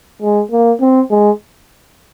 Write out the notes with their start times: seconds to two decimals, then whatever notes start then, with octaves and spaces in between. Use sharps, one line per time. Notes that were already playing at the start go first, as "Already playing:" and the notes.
0.22 G#3
0.51 A#3
0.81 C4
1.10 G#3